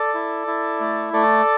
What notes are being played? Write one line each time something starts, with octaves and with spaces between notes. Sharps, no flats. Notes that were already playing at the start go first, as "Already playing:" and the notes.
Already playing: A4 D5
E4
E4
A3
A3 A4 D5